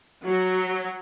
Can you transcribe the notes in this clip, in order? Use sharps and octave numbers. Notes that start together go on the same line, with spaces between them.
F#3